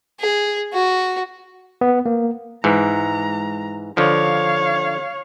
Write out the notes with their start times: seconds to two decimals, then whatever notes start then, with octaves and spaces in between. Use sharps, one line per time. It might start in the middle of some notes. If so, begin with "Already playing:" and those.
0.20 G#4
0.73 F#4
1.81 B3
2.06 A#3
2.64 G#2 E3 A#5
3.97 D3 F3 C#5 F5